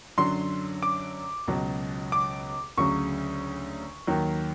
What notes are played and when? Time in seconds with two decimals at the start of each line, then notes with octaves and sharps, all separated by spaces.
0.18 F#2 D3 F#3 C6
0.83 D6
1.47 C#2 B2 F#3
2.12 D6
2.77 D2 C#3 F#3 C#6
4.07 D#2 D#3 F#3